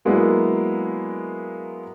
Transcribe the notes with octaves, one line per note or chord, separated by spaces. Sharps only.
F#3 G#3 A#3 B3 D4 E4